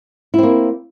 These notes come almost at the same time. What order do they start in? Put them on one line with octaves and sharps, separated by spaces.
E4 C4 A#3